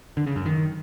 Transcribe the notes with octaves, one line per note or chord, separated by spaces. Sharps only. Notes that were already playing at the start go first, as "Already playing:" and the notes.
D3
C#3
F#2
D#3